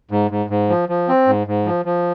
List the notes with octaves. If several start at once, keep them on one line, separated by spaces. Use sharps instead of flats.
G#2
G#2
G#2
F3
F3
C4
G#2
G#2
F3
F3